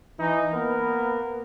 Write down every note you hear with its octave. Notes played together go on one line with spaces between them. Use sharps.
E3 D#4
A#3 B3 A#4 B4